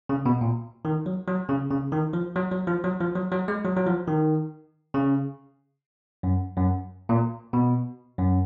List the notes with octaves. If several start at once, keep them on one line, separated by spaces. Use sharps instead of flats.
C#3
B2
A#2
D#3
F#3
F#3
C#3
C#3
D#3
F3
F#3
F#3
F3
F#3
F3
F#3
F#3
G#3
F#3
F#3
F3
D#3
C#3
F#2
F#2
A#2
B2
F#2